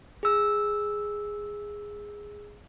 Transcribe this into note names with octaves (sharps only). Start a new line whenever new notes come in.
G#4 E6